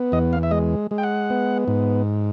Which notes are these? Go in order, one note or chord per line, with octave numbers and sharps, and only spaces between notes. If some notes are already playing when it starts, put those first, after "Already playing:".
Already playing: B3
E2 D#5
F5
E5
G#3 D#5
G#3
G5
F#5
B3
G#2